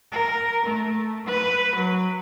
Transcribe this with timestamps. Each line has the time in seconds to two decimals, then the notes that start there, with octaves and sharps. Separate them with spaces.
0.12 A#4
0.65 A3
1.26 B4
1.75 F#3